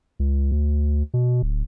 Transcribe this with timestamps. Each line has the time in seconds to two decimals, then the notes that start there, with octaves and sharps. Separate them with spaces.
0.20 C#2
0.51 D2
1.14 B2
1.42 D1